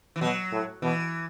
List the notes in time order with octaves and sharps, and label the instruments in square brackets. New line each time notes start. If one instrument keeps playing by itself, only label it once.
[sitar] E3
[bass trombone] B2 [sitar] F#3
[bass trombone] A2
[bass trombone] B2 [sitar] E3